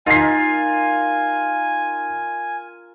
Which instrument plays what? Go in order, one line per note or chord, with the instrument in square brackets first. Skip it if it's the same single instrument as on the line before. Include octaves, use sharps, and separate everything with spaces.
[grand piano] D#4 C7 [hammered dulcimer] F4 A#4 [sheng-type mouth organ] G#5